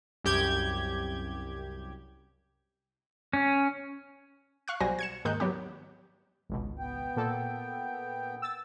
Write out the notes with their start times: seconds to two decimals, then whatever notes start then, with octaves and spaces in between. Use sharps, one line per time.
0.24 C2 F#2 G4 G6 G#6
3.33 C#4
4.68 F5 C#6 F#6
4.80 B1 G3 F#4 C5 G#5 A#6
4.99 G#6 C#7 E7
5.25 D#2 G#2 D#3 D#4 F#6 G6
5.40 F#3 B3 G4
6.50 G#1 C#2 B2
6.79 B3 G5
7.16 A#2 A#3 A4
8.42 E6 A6